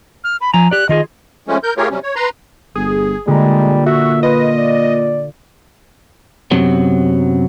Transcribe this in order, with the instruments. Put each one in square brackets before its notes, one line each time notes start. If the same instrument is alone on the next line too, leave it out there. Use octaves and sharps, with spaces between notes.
[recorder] F6
B5
[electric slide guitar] F3 A#5 [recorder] G#5
[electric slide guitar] G4 D5 [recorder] F#6
[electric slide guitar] D#3 F4 G#4 [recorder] D#5
[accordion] F3 G#3 A3 C#4
A#4 G6
A3 F4 G4 G#4 A#4 C#5
C3 F#3 G3 C#4
C#5
B4 A#5 C6
[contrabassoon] G1 [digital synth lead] G#4
[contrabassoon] A#2 [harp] D3 A#5 [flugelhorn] G3 [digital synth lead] G#3
[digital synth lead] F#4 [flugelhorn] E5
[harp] F4 [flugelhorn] B4 [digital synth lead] D#5
[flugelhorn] D5
[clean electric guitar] F#2 C3 F#3 B3